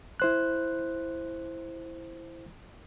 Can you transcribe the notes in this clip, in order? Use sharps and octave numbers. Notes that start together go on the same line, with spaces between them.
E4 C5 F#6